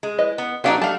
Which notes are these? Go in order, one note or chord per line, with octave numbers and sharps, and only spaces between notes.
G#3
E4 B4 D#5
B3
F#3 B3 D4 D#4 G4 F5
G3 A3 F5 A5